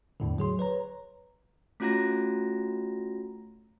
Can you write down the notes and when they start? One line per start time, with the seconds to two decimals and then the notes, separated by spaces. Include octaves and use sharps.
0.20 E2 A2 D3
0.38 F#3 G#4 C6
0.59 B4 C#5 A#5
1.80 A3 C#4 F4 F#4 A#5 A#6